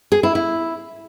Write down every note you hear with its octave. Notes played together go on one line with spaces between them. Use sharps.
G#4
E4
E4